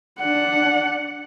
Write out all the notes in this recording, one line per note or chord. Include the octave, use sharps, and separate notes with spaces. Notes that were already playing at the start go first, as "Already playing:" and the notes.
D4 F#5